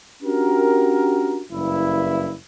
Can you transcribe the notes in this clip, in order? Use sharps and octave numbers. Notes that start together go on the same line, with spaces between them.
C#4 D4 F#4 G4 A#4
F#1 G2 E4